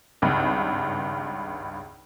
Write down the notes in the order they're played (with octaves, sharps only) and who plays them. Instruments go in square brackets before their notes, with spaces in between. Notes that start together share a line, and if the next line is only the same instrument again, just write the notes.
[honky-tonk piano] G#1 C#2 G2